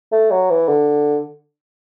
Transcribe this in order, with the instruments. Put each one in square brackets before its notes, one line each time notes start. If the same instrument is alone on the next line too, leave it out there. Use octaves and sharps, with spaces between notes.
[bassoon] A3
F#3
E3
D3